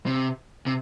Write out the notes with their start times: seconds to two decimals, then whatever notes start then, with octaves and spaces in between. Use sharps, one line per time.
0.06 C3
0.66 C3